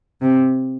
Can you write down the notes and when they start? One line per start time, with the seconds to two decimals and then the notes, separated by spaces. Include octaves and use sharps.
0.21 C3